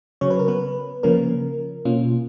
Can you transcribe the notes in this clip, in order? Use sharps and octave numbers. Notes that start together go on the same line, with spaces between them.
C#3 F#3 C#4 C#5
B4
A#4
B3 B4
C#3 F3 A#3 C#4 A#4
B2 A#3 C#4 F4